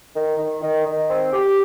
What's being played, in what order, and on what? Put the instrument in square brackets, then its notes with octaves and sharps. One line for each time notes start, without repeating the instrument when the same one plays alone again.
[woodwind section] D#3
D#3
D#3
D#3
C4
G4